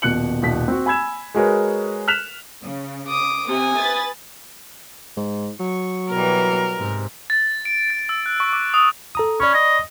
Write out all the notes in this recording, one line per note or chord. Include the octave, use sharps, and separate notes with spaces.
D#1 B2 F#6 C#7 F#7
D#1 B1 B6
C4 F#4
G#5 B5 E6 G#6 E7
G#3 F#4 G#4 A#4 B4 C#5
F6 F#6 B6 E7 F7
C#3
D6 D#6
C3 G#5 D#6
B4 A6
G#2
F#3 C#6
B2 E3 G3 A#4
G#2 C3
A6
D7
A6
E6
F#6
C#6
D6
D#6
A4 A#5 D#6
C#4 D5 B5 C#6
D#5